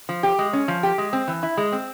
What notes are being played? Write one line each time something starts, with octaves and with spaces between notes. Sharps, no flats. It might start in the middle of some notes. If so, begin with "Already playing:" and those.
F3
G4
G#3
C#4
F3
G4
G#3
C4
E3
E4
G#3
C4